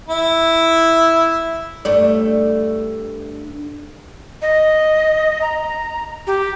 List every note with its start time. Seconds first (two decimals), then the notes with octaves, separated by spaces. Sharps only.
0.08 E4
1.85 G2 A3 D5
4.42 D#5
5.42 A#5
6.27 G4